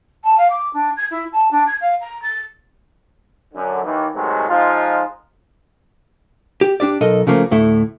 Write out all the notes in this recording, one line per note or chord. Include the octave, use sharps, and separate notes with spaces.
A5
F5
D6
D4
G#6
E4
A5
D4
G#6
F5
A#5
A6
F#2 D3
D#2 D#3 E3
E2 A2 C3 D#3 F#3 G#3
F3 G#3 D#4 F4
G4
D4 G4 D5
B1 A4 A#4 D#5
C#3 F3 A3 A#3
D2 A2 A3 E4